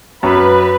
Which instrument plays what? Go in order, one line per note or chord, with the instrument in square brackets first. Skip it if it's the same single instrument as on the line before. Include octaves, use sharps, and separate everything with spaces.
[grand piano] F#2 [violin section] B4